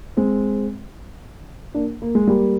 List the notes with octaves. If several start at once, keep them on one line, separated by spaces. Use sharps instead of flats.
G#3 C4
A#3 D4
A#3
G#3
G3 A#3